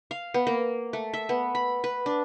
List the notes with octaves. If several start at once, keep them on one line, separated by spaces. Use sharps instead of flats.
F5
B3
A#3
A3
E5
B3
B5
B4
D4